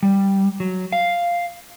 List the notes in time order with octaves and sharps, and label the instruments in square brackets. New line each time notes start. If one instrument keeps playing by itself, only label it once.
[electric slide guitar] G3
F#3
F5